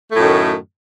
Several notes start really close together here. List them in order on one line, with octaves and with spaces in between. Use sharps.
A3 A2 F#2 D#3